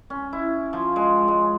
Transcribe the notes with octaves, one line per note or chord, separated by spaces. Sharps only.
C#4
E4
F3
G#3
G#3